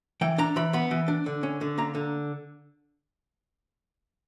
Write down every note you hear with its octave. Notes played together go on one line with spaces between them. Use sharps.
E3 G5
D4 A#5
E3 B5
B3 B5
E3
D4
D3
C#4
D3
A#3 A#5
D3